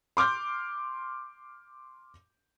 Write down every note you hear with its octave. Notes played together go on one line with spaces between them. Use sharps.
C6 D6 F6 G6